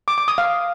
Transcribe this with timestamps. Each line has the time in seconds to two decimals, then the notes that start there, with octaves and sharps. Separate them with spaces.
0.08 D6
0.18 D6
0.28 D#6
0.38 F5